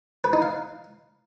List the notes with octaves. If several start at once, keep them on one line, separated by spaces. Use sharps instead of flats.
B4
D#4
F5